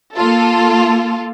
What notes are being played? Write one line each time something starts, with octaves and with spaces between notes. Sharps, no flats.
A#3 F4 A4